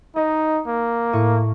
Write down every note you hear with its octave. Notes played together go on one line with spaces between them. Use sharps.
D#4 D#5
A#3
A2 C#6 D#7